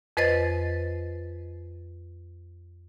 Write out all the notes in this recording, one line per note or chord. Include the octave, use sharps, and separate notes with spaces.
F2 B4 C5 D#5 A6